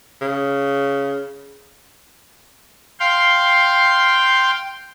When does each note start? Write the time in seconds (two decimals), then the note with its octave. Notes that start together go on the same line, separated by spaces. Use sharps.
0.21 C#3
3.00 F5 G5 C6